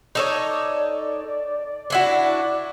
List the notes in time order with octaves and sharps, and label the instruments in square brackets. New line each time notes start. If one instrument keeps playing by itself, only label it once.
[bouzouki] D#4 A4 C#5 [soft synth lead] D5
[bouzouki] D4 E4 F#4